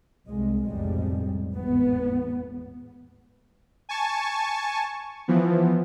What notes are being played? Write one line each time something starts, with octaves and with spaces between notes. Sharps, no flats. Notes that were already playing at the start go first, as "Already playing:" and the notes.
C2 G#3
F1 B1 F2 A2 G3 G#3
G#1 E2 A2 B3
G#5 A5 C#6
E3 F3 B3